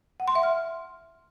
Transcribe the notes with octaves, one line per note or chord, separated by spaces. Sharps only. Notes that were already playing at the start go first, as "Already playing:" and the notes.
F#5
C6
E5
F6